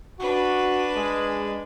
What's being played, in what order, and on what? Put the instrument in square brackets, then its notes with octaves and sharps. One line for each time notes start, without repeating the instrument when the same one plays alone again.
[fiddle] D4 B4 [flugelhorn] F#4
[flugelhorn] G#3